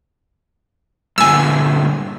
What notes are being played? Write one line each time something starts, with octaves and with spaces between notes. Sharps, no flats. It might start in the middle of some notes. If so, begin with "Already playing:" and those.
G2 A#2 D3 G#5 E6